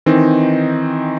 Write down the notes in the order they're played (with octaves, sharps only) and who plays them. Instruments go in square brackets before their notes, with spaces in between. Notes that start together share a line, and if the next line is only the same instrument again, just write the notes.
[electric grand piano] D#3 E3 C4 D#4